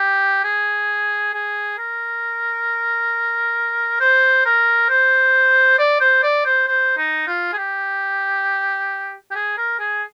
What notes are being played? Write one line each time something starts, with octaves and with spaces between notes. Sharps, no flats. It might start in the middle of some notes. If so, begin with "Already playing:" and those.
Already playing: G4
G#4
G#4
A#4
C5
A#4
C5
D5
C5
D5
C5
C5
D#4
F4
G#4
G4
G4
G#4
A#4
G#4